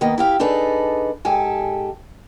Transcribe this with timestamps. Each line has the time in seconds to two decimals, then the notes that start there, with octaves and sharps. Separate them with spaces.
0.01 D#3 A#3 B3 D#4
0.18 E4 G4 F5
0.39 D4 D#4 G#4 A4 B4
1.25 G#2 G4 A4 G#5